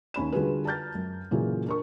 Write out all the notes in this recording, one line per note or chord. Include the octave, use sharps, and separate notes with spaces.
D#2 C#4 B5 E7
D3 G3 F4 F#4 G#4 B4
A5 A#5 F6 G6 A6
F#2
A#2 C#3 E3 F#3 G#4
D4 A#4 C#6